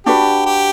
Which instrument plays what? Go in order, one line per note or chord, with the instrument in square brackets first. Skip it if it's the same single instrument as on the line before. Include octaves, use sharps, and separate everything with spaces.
[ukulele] D4 F#4 B4 [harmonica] G4
[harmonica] G4